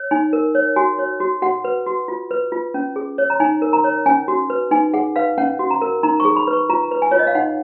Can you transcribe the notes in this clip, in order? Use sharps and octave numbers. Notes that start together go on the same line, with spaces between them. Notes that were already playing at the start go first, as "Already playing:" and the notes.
Already playing: C#5
D#4 G#5
A#4
C#5
F#4 G#5
C#5
F#4
F#4 F#5
B4
F#4
F4
B4
F4
C#4
G#4
C#5
A#5
D#4 G#5
A#4
A#5
C#5
C#4 G#5
F#4
B4
D#4 G#5
G#4 F#5
B4 F5
C#4 F#5
F#4
A#5
A#4
D#4 A#5
C#6
G#4
B5
B4
C#6
F4 A#5
B4
G#5
F4 C#5
D#5
F5
D#4 F#5